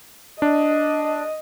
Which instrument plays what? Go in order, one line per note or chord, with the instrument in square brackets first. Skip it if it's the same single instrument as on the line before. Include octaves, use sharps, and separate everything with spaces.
[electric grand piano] D4 [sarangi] D#5